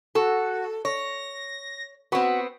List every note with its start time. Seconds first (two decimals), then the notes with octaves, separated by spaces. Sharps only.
0.15 F#4 A4
0.85 C#5 A#6
2.12 B3 C4 F#4